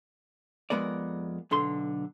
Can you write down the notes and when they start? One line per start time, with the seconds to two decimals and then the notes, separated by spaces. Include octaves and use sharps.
0.70 F2 C3 G#3 B3 A#4 D5
1.51 B1 D3 A4 C6